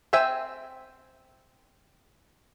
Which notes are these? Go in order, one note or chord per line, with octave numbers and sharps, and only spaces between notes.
C4 C5 E5 G5 G#5